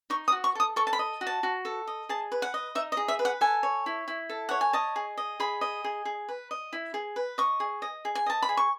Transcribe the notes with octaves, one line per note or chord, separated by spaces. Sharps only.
D#4 C#6
D#6
F#4
C#6
A4 D#6
A4 C#6
A5
B5
D#5
F#4
A5
F#4
A4
D#5
G#4 A5
B4
F#5
D#5
D#4 E5
D#5
G#4
E5
B4
F#5
A4 G#5
C#5
E4
E4
A4
C#5 F#5
G#5
D#5 A5
G#4
D#5
G#4 B5
D#5
G#4
G#4
B4
D#5
E4
G#4
B4
D#5 C#6
G#4
D#5
G#4
G#5
D#5 A5
B5
G#4
C#6